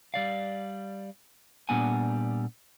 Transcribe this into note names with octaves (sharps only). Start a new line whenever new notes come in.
G3 D5 F5
A#2 G3 B3 D4 F#5 G#5